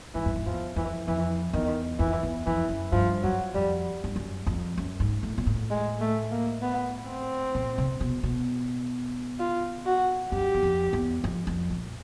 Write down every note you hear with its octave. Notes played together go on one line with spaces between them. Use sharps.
G#2 E3
F#2
F2
E2 F3
F2 E3
F2 E3
E2 D#3
F2 E3
E2
F2 E3
F#2
G2 F3
F#2 F#3
F2 G3
G2
F#2
F2
F#2
G#2
A2
A#2
A2
G#3
A3
A#3
B3
C4
A#2
C3
B2
B2
F4
F#4
F#2 G4
E2
F2
E2
F2
F2
A#2